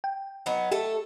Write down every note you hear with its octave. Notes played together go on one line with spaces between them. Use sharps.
G5
F#3 B3 D#4
A3 G4 A4